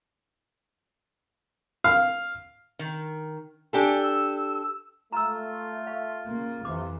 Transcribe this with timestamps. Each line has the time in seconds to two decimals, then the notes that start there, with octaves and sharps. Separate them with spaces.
1.84 F5
2.79 D#3
3.73 D4 G4 A4 G#5
4.02 E6
5.12 A3 F4 A#5 E6
5.87 F5
6.26 C#3 A#3
6.65 F2 C3 E3 D6